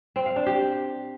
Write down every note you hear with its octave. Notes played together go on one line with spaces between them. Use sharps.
C4
F5
D4
G4